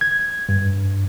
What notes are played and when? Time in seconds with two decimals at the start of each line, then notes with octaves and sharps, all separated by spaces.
0.01 G#6
0.49 G2